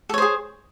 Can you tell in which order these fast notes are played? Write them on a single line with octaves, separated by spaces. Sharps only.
A4 C#5 C5 G#4